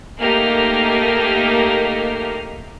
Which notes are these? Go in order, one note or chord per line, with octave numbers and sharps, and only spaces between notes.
A3 A#3 D#4 G4 A#4 F6